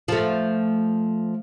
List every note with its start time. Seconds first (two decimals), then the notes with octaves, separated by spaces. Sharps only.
0.08 F3 A3